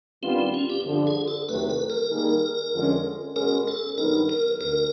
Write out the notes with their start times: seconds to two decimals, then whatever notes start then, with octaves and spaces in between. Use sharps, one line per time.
0.23 D#3 G3 B3 C4 D4 F4
0.38 C4
0.54 C#4
0.70 G4
0.85 G2 D3 F3
1.07 G#4
1.28 A4
1.49 E2 C3 D#3 F#3 A3 B4
1.70 B4
1.90 A#4
2.10 D#3 G3 A#3 D#4 G#4
2.73 F2 D3 F3 G#3 C#4
3.36 B2 G#3 C#4 A#4
3.68 A4
3.98 G2 D#3 F#3 B3 D#4 A#4
4.29 A#4
4.61 D2 A#4